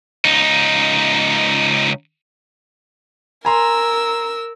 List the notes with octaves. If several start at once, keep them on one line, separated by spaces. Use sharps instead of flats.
C#2 D#4
A#4 G#5 A#5 C6 E6